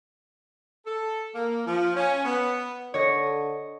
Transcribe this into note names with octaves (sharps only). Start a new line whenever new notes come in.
A4
A#3
F3
C#4
B3
D3 C#5 D#5